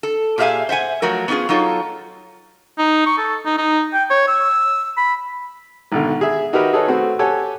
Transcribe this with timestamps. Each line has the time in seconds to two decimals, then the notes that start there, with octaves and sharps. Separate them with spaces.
0.03 A4
0.38 A#2 G4 G#4 E5 F5 G#5
0.69 C5 E5 F#5 G#5
1.02 F3 F#3 A3 A#4
1.28 B3 C#4 D#4 F4 G#4
1.49 F#3 D#4 F4 A4 C#5
2.78 D#4
3.06 C#6
3.18 A4
3.46 D#4
3.58 D#4
3.93 G5
4.10 C#5
4.28 E6
4.97 B5
5.92 G#1 B2 D3
6.21 G#4 E5
6.53 D#4 F#4 G4 A#4 B4 E5
6.73 D#4 G#4 A4 B4 C#5
6.87 A3 C4 F#4
7.19 G4 A4 C#5 F#5 G#5